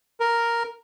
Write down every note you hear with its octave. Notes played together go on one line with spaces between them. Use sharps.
A#4